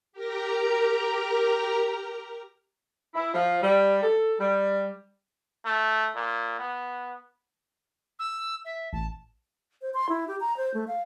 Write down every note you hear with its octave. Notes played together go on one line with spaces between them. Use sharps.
G4 A#4 A#5
E4
F3
G3
A4
G3
A3
A#2
B3
E6
E5
A1 A5
C5
C6
E4
G4
A#5
C5
A3
F5